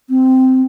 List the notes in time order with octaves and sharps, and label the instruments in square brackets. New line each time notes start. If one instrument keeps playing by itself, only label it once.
[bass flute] C4